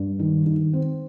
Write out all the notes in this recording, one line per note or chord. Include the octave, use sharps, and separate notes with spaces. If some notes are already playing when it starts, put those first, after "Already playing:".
Already playing: G2
D#3
D#3
C4